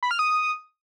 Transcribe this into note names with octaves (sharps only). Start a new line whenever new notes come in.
B5
F6
D#6